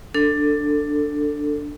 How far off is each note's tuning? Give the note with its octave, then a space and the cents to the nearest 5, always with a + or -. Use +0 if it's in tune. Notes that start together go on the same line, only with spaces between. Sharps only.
D4 +0 A4 +15